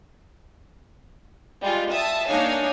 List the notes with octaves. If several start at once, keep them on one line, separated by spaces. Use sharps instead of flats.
G3 G#3 F4
E5 A5 D#6
A#3 D4 D#4 C#5 F5 G#5